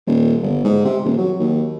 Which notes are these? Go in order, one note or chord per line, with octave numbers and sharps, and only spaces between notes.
D#1
G1
G#2
C3
D#1
F#3
D#2